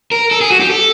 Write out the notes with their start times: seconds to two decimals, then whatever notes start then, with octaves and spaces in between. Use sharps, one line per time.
0.11 A#4
0.31 A4
0.41 G#4
0.50 F#4
0.60 G4
0.70 A4